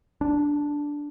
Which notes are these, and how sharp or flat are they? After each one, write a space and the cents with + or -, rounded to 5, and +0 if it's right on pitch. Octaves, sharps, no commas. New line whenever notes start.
D4 -5